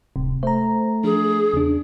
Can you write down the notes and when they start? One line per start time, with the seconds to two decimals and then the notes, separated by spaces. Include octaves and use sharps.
0.16 D1 C3
0.43 A3 C5 A#5
1.04 F3 D4 G#4
1.54 E2 C#3 D4